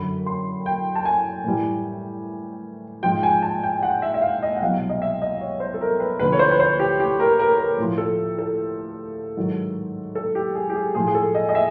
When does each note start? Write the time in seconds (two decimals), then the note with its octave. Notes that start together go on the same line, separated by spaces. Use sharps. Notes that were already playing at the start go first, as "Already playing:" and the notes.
Already playing: F#2 D3 F#3 B5
0.26 C6
0.66 G5
0.95 A5
1.05 G#5
1.44 A2 E3 G3
3.03 G#2 F3 G5
3.23 G#5
3.42 A5
3.63 G5
3.83 F#5
4.02 E5
4.14 E5
4.22 F5
4.43 D#5
4.56 F#5
4.62 C2 B2 F#3 F5
4.89 D#5
5.02 E5
5.22 D#5
5.41 C#5
5.60 C5
5.74 A4
5.81 A#4
6.00 B4
6.19 D2 D3 F3 B4
6.32 C#5
6.39 C5
6.51 B4
6.60 C5
6.80 G4
7.00 G4
7.20 A#4
7.39 A#4
7.58 A#4
7.78 A2 F3
7.98 A4
8.38 A4
9.37 G#2 D#3 F#3
10.15 A4
10.35 G4
10.55 G#4
10.70 G4
10.76 G#4
10.95 A2 F3 G#4
11.07 G#4
11.15 A4
11.35 D#5
11.49 D#5
11.55 E5